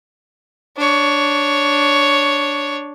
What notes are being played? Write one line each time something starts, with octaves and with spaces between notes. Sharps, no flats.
D4 C#5